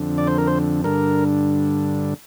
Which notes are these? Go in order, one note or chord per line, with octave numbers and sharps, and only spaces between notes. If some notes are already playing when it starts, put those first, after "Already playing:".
Already playing: F2 D3
D5
C5
A#4
C5
G2 D3 A#4